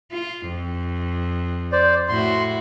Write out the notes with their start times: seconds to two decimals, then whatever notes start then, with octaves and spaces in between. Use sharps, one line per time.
0.11 F4
0.48 F2
1.72 C5 D5
2.09 A2 E4 F#4 C6